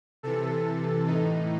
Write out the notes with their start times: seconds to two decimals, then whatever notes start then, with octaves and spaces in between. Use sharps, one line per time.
0.23 C3 E3 A4
1.07 A2 E3 D#4